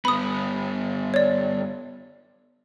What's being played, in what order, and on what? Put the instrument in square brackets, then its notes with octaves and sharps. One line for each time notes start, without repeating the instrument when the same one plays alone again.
[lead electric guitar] G2 B3 [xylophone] B5 D#6
[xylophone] C#5 D5